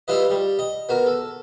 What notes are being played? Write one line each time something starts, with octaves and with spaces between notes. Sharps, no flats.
G3 E4 F4 B4 D#5
G3
D#5
B3 F#4 A#4
A4